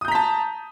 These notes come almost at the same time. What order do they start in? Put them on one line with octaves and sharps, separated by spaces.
D#6 G6 A#5 B6 A5